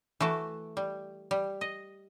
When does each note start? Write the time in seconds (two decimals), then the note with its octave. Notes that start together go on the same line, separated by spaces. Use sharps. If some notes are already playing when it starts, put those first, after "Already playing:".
0.20 E3 A3 F#4 A5
0.77 G3
1.31 G3
1.61 D#5